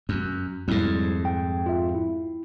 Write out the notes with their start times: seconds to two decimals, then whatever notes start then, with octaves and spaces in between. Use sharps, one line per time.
0.09 F#2
0.68 F2 G#2 G3 E4
1.25 G5
1.66 F4 E5
1.94 E4